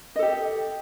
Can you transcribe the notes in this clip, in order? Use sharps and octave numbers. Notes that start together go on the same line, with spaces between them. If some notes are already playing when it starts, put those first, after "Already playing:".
G4 A4 D#5